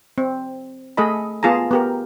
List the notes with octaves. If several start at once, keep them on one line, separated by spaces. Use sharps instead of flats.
C4
A3 G#4 A4 D#5 B5
B3 F4 G#4 A5 A#5
B3 G4 A#4